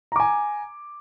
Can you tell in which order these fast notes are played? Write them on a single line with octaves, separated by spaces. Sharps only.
A#5 D6 G#5